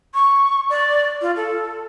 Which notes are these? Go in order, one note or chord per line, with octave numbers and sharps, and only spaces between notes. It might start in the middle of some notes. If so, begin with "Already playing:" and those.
C#6
D5
F4
A4